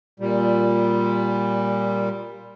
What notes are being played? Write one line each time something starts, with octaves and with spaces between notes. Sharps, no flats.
A#2 G3